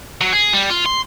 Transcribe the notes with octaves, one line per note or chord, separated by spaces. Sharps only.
F#3
G#4
G3
F4
C6